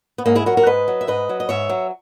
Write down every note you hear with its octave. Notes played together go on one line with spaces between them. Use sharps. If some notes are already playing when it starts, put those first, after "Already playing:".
B3
G#2 A#3 C#4
E4 G#4
F#3 F#4 A#4
F#4 A#4
G#2 B4 D#5
F#3
E5
G#2 B4 D#5
F#3
D#5
G#2 C#5 E5
F#3